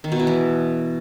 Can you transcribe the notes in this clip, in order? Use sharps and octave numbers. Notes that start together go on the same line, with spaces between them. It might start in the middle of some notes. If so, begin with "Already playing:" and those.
D#3
B2
E4
E3